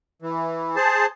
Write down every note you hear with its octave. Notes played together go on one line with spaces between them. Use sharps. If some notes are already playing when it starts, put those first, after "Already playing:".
E3
G#4 C5 A5